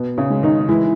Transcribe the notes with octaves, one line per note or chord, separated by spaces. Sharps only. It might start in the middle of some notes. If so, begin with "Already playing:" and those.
Already playing: B2 B3
C#3 C#4
G#3
D#3 D#4
E3 G#3 E4